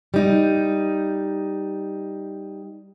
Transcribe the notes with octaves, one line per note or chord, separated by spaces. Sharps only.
G3 D#4